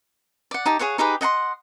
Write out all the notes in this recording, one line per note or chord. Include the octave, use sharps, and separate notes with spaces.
D5 F#5
D#4 G4 A5
G#4 C#5 F5 F#5
D#4 G4 G#4 B4
D#5 F#5 A5 C6